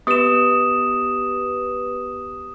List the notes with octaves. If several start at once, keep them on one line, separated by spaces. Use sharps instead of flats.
B3 G4 B4 D#6 E7